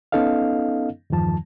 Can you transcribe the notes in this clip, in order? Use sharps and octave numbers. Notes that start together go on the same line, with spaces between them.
B3 C#4 D#4 A4 D#5 F5
E2 G2 D#3 F3 A5